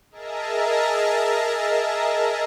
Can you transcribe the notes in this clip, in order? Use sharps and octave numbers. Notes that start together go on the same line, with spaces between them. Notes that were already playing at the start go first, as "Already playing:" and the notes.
G#4 A#4 D#5 E5 A5 A#5